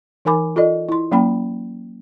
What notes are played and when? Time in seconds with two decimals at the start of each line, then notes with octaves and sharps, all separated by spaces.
0.25 E3 D#4 A#4 G#5 B5 D6
0.56 F4 A4 D5 D#5
0.89 E4 C6
1.12 F#3 A#3 C#4 G5 B5